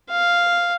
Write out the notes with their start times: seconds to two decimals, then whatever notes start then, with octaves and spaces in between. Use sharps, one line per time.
0.10 F5